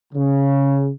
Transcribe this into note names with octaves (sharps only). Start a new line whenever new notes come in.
C#3